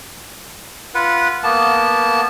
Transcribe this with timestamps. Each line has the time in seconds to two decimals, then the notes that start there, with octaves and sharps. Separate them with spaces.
0.95 F4 B4 F#5
1.44 A#3 B3 A5